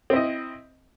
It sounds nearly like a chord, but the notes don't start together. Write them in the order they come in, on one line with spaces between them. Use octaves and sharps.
C4 E4 D#5